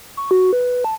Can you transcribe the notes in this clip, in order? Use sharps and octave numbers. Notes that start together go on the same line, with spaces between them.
C#6
F#4
B4
A5